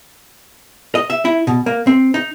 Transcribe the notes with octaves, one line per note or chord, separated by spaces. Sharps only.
D#5
E5
E4
B2
A#3
C4
D#4